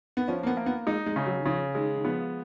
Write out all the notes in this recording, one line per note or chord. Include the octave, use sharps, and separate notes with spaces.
B3
F3 C#4
A#3
B3
A#3
B3
G#3 D#4
G#3
C#3
F#3
D#3
C#3 F3
D#3 G#3
D#3
F3 B3